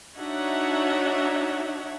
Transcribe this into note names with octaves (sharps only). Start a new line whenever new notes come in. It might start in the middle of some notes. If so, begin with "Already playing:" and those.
D4 D#4 F#4 C#5 E5 F#5